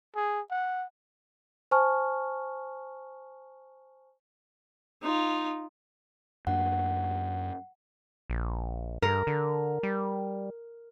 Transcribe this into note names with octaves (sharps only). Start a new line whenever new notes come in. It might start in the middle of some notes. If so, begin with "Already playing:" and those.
G#4
F#5
C5 G#5 A5 C#6 F6
D#4 F4
F#2 A#3 D4 F#5
A#1
G2 A#4
D3
G3